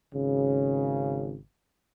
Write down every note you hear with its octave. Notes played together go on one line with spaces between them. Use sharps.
G#1 C#3